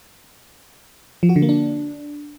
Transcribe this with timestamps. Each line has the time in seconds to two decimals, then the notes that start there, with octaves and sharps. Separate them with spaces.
1.23 F3
1.29 F#4
1.36 D3
1.42 A#3
1.49 D4